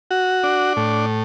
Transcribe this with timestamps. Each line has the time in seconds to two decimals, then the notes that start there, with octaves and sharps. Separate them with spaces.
0.11 F#4
0.43 D4
0.77 A2